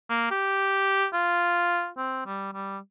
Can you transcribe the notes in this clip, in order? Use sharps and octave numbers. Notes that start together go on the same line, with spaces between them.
A#3
G4
F4
C4
G3
G3